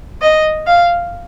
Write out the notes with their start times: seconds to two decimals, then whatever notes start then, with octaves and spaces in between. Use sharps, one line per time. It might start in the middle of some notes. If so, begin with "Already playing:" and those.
0.21 D#5
0.67 F5